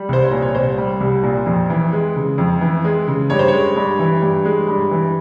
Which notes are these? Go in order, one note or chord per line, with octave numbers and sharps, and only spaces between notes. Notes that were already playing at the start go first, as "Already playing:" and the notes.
Already playing: G3
C2 C5
C#5
A#2
C#5
C2 C5
G3
C2
A#2
F2
E3
G#3
C#3
F2
E3
G#3
C#3
G2 C#5
C5
G#3 C#5
G2
E3
G2
G#3
G2
E3